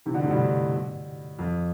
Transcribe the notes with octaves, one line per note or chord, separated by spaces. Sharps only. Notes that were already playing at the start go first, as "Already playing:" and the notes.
C3 E3
B2 D3
A2 C3
G2 B2
F2